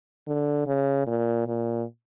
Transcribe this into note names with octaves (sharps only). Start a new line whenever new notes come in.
D3
C#3
A#2
A#2